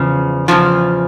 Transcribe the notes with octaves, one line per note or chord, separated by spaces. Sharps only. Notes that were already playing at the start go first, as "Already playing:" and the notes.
Already playing: E2 C#3 F3
E2 C#3 F3